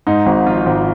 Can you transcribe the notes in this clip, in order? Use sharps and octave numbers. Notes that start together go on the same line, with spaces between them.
G#2 D#4
G#1
F3 F4
G#1